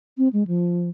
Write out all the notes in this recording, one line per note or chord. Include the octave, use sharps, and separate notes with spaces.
C4
G#3
F3